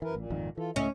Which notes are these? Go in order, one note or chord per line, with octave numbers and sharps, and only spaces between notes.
F#2 E3 A#4 B4
A1 A#2
G#1 F2 D#3
E3 F4 A4
C#2 A2 A3 C#4 D#5 E5